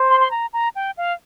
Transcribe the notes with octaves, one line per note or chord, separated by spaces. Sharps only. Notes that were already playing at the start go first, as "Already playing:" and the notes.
Already playing: C5
C6
C6
A#5
A#5
G5
F5